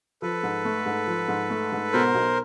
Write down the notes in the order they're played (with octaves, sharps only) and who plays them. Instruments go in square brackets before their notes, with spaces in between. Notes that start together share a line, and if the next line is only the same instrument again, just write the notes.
[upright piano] F3 [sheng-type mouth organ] A4 B4
[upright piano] G#2
A3
G#2
F3
G#2
A3
G#2
[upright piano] B2 [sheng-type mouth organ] A#4 C5
[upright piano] B1